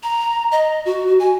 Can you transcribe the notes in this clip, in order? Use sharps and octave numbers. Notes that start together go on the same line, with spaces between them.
A#5
D#5
F#4
G#5